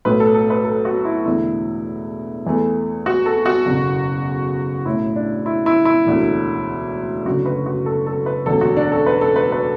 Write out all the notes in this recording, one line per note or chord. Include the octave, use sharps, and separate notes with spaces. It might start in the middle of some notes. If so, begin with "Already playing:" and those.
B1 A2 A3 B4
A4
A4
B4
A4
F#4
E4
E1 E2 D3 A3 E4
E2 E3 A3
F#4
A4
F#4
F#1 E2 B2
B1 A2 F#3 E4
D4
E4
E4
E4
E1 D2 D3
F#1 F#2 D3 A3 F#4
B4
F#4
A4
A4
B4
E1 D2 D3 A4
F#4
D4
A4
B4
A4
B4
B4